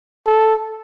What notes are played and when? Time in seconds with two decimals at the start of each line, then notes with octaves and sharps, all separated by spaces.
0.26 A4